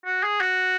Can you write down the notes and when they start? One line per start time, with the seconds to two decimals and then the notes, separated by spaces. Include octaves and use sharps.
0.05 F#4
0.23 G#4
0.40 F#4